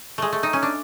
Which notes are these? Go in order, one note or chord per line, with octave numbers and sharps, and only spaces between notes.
G#3 A3
A3
D#4
C#4
D4